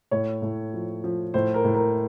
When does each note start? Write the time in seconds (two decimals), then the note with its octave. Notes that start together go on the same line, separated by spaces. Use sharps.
0.11 A2 C#5
0.42 A2
0.74 F3
1.04 F3
1.34 A2 C5
1.54 A#4
1.64 A2
1.75 A#4